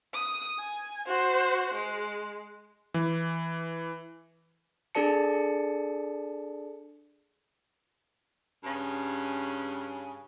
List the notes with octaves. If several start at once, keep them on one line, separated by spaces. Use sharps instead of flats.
D#6
G#5
F#4 C5
G#3
E3
D4 G#4 A4 D5 A5 C#7
G2 C#3 C#4